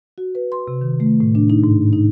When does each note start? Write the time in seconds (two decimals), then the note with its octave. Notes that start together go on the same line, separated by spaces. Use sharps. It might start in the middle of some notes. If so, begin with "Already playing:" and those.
0.18 F#4
0.35 B4
0.52 C6
0.68 C3
0.81 D#3
1.00 A3
1.20 A2
1.35 D4
1.50 D#4
1.64 G#2
1.93 D#4